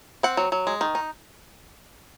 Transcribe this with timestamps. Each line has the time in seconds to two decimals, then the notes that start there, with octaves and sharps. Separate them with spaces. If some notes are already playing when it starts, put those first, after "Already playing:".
0.23 C4 F#5
0.37 F#3
0.52 F#3
0.67 G#3
0.81 D#3
0.95 D#4